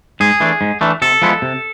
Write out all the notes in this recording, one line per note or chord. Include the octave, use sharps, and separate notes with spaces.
G#2 G#4
E3 A3 D4
G#2
E3 A3 D4
C3 A4
F3 G#3 B3 E4
C3